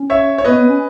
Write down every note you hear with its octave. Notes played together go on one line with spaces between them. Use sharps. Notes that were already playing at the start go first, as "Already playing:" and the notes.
Already playing: C#4
C#5 E5
C#5
B3 B4 D#5
B3
C#4